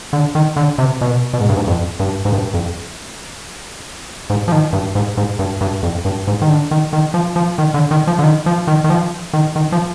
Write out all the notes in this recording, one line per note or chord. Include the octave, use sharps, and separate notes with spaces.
D3
D#3
D3
C3
B2
B2
G#2
G2
G#2
F2
G2
G#2
G2
F2
G#2
F3
D#3
G2
G#2
G#2
G2
G2
F2
G2
G#2
D#3
D3
D#3
D#3
F3
F3
D#3
D3
D#3
F3
D3
D#3
F3
D#3
D#3
F3
D#3
D#3
F3